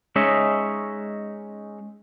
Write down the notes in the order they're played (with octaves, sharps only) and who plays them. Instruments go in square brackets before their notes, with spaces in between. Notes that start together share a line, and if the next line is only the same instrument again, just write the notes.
[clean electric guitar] G#3 C#4 D#4 C#5 D#5 E5